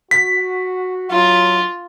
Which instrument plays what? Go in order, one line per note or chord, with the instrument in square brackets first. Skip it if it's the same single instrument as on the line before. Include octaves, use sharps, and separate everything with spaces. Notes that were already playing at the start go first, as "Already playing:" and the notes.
[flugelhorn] F#4 [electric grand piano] B6
[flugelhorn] F#3 [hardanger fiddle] F4